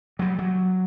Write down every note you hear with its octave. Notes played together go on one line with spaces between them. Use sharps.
F#3 G3
F#3